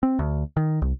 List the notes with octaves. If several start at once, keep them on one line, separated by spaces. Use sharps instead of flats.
C4
D2
D#3
C2